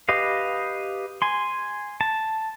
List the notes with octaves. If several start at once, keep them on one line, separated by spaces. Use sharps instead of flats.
G4 B4 D#5 F5
G#5 C6
A5